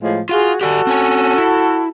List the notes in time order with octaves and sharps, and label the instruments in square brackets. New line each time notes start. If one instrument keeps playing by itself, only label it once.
[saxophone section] A2 F3 G#3
[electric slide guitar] F4 F5 [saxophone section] F#4 G#4
[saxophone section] F#4 A4 [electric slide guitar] G4 D5 G#5
[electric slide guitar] C4 C#4 G#5
E4